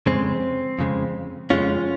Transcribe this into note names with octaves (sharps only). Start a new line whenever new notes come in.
F2 C#3 G#3 C4
F2 C#3 G#3
F2 C#3 G#3 C#4 F4